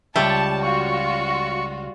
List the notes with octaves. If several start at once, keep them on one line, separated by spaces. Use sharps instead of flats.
C#2 G3 C#5 E5 A5
F4 F#4 C#6